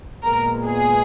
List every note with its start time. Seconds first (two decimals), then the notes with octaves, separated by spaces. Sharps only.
0.24 A#2 G#3 B3 A#4
0.67 G#4